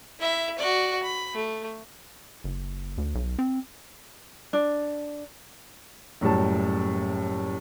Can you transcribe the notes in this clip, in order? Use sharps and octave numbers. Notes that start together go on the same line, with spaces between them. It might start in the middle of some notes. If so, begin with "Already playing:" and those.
E4 E5
F#4 D5
B5
A3
F#1
D2
B1
C4
D4
F#1 A2 F#3 G3 A5